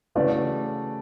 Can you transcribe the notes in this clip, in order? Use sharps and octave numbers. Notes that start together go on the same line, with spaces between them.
C#3 E3 A3 C#4 F#4 B4 D5